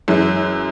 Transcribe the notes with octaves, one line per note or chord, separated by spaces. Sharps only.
F#2 E3 G#3